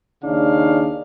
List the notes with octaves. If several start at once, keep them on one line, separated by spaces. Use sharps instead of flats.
D#2 C#3 D4 D#4 F5